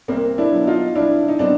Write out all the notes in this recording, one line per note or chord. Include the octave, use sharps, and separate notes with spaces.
C2 A#3 C4
D4 E4
B2 F#3
D#4 F4
C2 D4 E4
D#4
B2 F#3 C4 D4